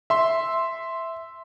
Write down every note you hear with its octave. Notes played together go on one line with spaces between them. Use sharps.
E5 C6